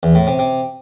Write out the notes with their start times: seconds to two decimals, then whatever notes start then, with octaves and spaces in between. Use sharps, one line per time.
0.03 E2
0.15 A2
0.27 C3
0.39 C3